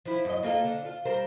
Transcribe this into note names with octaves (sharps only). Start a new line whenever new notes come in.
F3 E4
F#2 D#5
A#3 F4 A4
D3
F4
G3 A#4 C5